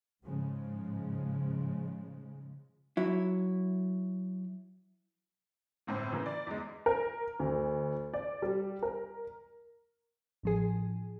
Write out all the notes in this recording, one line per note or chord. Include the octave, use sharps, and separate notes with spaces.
G#2 C#3 F3 G#3
F#3 E4
G1 A2 C4
C#3 E3 A#3
D5
E2 G#3
A#4
D2
D5
G3
A#4
A1 F3 G#4